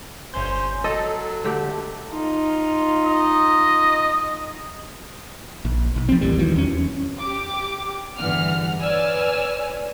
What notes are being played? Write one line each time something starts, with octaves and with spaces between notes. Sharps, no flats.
G1 C#4 C5 G6
F#3 A4 D#5
D3 A3 G4
D#4 F4
D#5
A#1
B1
F3 C4
A1 D#2 A#2 G3
D#3 E3 F#3
E2 C#4
G4 D6
E2 G2 D3 E3 F#5 F6
B4 C#5 D5 G#5 E6 F6